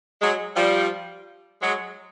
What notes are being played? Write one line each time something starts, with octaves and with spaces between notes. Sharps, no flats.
F#3 G#3
F3 G3
F#3 G#3